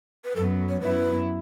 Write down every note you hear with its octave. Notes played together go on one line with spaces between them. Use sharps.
B4
F#2 F#3 B3 A4
C#5
F#2 F#3 B3 E4 B4